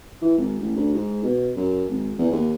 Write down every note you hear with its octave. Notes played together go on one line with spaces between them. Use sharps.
E3
G#1
A1
D2
G#2
B2
F#2
G#1
E2
D#2